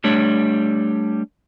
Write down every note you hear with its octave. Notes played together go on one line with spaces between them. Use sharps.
G3 A3 D4 C#5